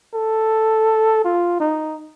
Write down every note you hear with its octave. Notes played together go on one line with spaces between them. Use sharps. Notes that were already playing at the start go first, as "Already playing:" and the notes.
A4
F4
D#4